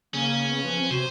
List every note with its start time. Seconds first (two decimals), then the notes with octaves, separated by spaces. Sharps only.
0.14 C#3 A#3 C#4
0.48 B3
0.64 F3 B4
0.78 C4
0.91 C3 F#4 C5